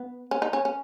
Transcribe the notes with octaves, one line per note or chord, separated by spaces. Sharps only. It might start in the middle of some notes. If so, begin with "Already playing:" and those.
Already playing: B3
C#4
D#4
C#4
C#4